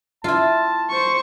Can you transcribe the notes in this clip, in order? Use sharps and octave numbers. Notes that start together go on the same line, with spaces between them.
E4 F4 A5
C5 C#6